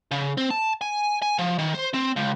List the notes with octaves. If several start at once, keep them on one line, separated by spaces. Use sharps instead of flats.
C#3
C4
A5
G#5
G#5
F3
D#3
C5
C4
C#2